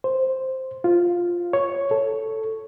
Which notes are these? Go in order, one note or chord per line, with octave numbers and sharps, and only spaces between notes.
C5
F4
C#5
A4